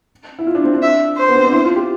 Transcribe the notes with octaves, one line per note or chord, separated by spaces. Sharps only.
E4
F4
D4
C4
D4
E5
C5
B3
C4
D4
E4
F4
G4